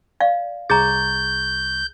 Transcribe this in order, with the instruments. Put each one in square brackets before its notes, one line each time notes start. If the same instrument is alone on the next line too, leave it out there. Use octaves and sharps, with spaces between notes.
[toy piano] D5 F5
[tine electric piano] C2 C#6 A6 [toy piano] G#4 A#5 [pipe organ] G6